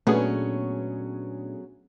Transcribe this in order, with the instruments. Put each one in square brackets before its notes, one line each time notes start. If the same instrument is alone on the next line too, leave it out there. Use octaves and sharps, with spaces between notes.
[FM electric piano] A#2 D4 [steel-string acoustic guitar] F#3 C#4 [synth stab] A3 B3 G#4